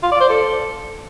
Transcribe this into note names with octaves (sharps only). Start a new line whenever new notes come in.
F4
D5
C5
A4